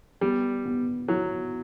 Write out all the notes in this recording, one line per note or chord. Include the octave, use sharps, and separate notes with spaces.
G3 B3
B3
F#3 E4